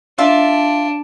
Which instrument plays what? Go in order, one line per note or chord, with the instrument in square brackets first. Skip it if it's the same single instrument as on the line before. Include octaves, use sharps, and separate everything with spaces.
[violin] D4 [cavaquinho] F4 E5 A5